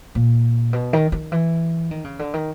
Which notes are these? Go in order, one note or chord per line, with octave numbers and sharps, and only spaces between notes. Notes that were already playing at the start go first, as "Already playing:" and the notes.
A#2
B2
D#3
D#3
E3
D#3
C#3
D3
D#3